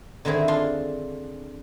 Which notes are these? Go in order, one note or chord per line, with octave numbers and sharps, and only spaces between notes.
D3 D#3 C4 E4 G#4
D4 F4 C6